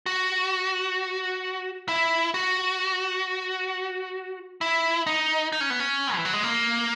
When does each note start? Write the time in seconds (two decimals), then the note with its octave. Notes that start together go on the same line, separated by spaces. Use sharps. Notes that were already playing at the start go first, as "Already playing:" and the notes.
0.06 F#4
1.88 E4
2.34 F#4
4.61 E4
5.07 D#4
5.52 D#4
5.61 C#4
5.70 B3
5.80 C#4
6.16 E3
6.25 F#3
6.33 G#3
6.43 A#3